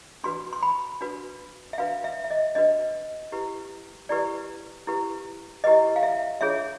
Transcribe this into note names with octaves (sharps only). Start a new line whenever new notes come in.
D4 F#4 B4 C6
C6
B5
D4 F#4 B4
E5
D4 F#4 B4 F5
E5
E5
D#5
D4 F#4 B4 D#5
E4 G4 B4
E4 G4 B4 D5
E4 G4 B4
E4 G4 B4 D#5
F5
E5
D4 F4 G#4 C#5 E5